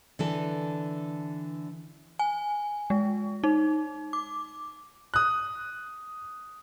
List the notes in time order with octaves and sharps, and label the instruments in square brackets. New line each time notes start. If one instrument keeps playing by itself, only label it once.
[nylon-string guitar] D3 E3 A4
[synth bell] G#5
G#3
D#4
D6
[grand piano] D#6 F#6